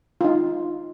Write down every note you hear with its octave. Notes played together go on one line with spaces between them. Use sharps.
F4
D#4